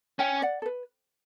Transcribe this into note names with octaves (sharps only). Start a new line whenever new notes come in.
C#4 E5 G5
D5 F#5
A4
B4